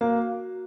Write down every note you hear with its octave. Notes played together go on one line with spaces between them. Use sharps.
A#3 F#4